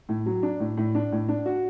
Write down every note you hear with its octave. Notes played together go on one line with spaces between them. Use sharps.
A2
F#3
D4
A2
A2
D4
A2
D4
F#4